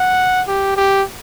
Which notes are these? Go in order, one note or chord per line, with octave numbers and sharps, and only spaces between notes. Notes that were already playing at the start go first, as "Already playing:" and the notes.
Already playing: F#5
G4
G4